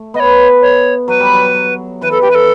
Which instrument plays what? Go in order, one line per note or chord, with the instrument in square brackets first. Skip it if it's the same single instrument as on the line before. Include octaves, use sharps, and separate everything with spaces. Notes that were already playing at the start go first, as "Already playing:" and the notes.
Already playing: [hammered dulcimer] A3
[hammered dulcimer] B3 [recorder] D#5
[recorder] C#5
C#5
[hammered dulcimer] F#3 [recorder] B4
[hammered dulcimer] G3
F#3
[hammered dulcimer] E3 [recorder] B4
[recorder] A4
G4
B4
A4